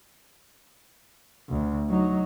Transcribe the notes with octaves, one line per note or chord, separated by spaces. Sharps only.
D2
F#3 D#4